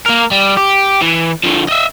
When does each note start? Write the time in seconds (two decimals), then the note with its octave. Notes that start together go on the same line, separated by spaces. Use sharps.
0.06 A#3 A#4
0.31 G3
0.57 G4
1.02 E3
1.43 D3 F3
1.68 D#5 E5